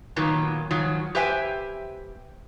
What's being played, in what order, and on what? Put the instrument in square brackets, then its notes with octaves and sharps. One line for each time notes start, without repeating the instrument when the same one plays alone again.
[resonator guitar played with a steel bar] A#2 D#3 F#3 A#3 B3
G#2 D#3 F3 F#3
G4 B4 C5 E5 G5 G#5